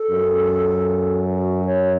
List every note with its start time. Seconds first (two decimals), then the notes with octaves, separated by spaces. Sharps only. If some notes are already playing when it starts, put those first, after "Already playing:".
Already playing: A4
0.11 F#2
1.36 F#4
1.65 C#5